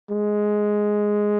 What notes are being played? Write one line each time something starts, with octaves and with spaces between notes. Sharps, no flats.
G#3